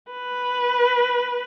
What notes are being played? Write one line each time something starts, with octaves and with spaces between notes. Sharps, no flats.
B4